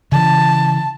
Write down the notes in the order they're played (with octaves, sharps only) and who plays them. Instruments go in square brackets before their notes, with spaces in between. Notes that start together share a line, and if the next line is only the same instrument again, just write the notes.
[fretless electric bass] C#3 E3 [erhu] A5